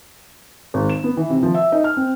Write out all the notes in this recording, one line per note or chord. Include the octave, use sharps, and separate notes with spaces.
G#1
E7
B3
E3
C3
F3
E5
D#4
F6
C4